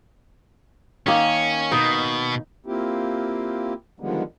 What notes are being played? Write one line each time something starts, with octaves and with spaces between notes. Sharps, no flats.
D#3 A#3 C#4
B2 D#4
A#3 C4 E4 F4 G4
D3 D#3 F3 G3 G#3 B3